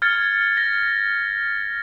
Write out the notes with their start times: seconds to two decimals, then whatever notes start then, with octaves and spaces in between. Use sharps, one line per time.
0.02 F6 G#6 A6 C#7
0.57 A#6